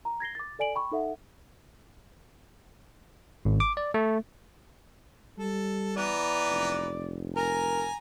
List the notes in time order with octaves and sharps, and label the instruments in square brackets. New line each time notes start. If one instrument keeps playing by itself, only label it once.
[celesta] A#5
G#6 A#6 C7 G7
D6 A6
A4 D5 G#5 D7 F#7
G5 B5 C#6
D#4 A4 E5 F#5
[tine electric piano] G#1
D6
D5
A3
[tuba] G3 [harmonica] A4
[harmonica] E3 B3 A#5 [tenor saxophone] D5
[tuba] F1
[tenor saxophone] A#4 [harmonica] G#5 A#5